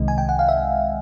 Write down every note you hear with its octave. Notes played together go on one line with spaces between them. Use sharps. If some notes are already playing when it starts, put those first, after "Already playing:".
Already playing: C2 C3 D#3 G#3 D#5
G#5
G5
F#5
F5
E5